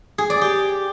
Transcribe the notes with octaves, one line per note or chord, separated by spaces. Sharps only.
G#4
D5
G4